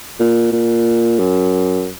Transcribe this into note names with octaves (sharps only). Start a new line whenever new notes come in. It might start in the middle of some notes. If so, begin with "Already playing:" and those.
A#2
A#2
F#2